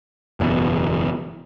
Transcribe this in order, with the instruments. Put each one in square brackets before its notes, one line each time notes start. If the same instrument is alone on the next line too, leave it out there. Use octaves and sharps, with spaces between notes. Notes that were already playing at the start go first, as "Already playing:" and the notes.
[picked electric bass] F#1 E2 G2 B2